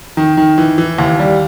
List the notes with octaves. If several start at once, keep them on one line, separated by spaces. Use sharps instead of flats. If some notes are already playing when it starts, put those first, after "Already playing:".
D#3
D#3
E3
E3
D#2
G3